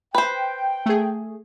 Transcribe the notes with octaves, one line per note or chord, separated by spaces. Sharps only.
B4 C5 G5
A3 G#4